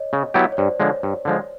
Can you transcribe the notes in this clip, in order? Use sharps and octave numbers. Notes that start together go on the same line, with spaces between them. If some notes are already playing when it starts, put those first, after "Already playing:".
Already playing: C#5 D#5
C#3
F#3 B3 E4 G4
C#5
G2 C5 D5
D3 F3 G#3 C#5
G2
D3 F3 G#3